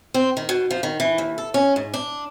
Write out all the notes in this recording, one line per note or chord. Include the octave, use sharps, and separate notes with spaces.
C4
D#3
B2
F3
D#3
E3
D#2
A4
C#4
G#2
D4